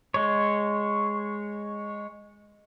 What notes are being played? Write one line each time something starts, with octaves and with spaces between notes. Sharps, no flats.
G#3 C#5